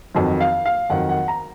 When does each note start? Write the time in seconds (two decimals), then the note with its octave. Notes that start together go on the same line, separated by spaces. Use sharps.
0.15 F2 D#3 F#3
0.41 F5
0.66 F5
0.90 F2 D#3 F#3 F#5
1.09 F#5
1.28 A#5